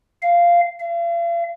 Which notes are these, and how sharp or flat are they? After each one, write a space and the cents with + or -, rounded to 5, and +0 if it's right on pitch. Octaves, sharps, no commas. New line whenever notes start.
F5 -10
F5 -40